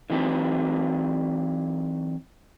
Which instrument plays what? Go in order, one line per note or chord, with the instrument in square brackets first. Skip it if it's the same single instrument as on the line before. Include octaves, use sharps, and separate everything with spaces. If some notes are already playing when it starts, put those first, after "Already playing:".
[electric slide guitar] D3 E3 F#3 C4 D#4 B4